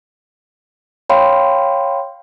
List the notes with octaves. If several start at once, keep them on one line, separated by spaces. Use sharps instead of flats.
C#5 F5 G5 B5 C6